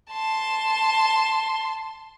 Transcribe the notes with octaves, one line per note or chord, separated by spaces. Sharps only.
A5 C6